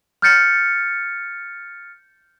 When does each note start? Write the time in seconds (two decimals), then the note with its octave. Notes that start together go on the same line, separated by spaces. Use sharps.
0.22 F6 G6 A6 C#7